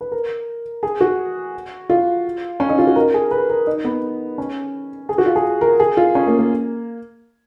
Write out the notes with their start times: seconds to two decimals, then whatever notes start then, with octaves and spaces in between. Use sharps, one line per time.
0.01 B4
0.12 A#4
0.83 G#4
1.01 F#4
1.90 F4
2.60 C#4
2.69 D#4
2.78 F4
2.87 F#4
2.96 A#4
3.14 G#4
3.31 B4
3.50 A#4
3.67 D#4
3.85 B3
4.38 C#4
5.09 G#4
5.18 F#4
5.26 F4
5.36 G#4
5.61 A#4
5.80 G#4
5.97 F4
6.15 C#4
6.27 A#3
6.39 A#3